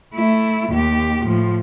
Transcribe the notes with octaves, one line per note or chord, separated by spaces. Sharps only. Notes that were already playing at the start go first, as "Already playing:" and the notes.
A3 E4
D#2 G4
A2 F3